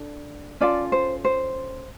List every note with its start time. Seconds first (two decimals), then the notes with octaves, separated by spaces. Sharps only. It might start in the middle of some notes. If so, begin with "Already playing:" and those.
Already playing: D4 A4
0.60 C#4 F4 A4 D5
0.92 C5
1.25 C5